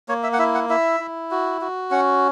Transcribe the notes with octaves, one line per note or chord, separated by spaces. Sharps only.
A#3 C#5
E5
F#5
E4 E5
F#5
E4 E5
E4
F#4
F#4
C#4 F#5